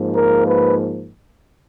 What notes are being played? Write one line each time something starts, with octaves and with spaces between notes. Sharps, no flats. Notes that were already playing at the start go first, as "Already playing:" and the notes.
Already playing: G#2 F3 A#3
A#4
B4